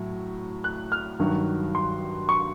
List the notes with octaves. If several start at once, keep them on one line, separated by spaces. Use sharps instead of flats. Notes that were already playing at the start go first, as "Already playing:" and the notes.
Already playing: A2 F#3
F#6
F6
G2 D#3 F#3
C6
C#6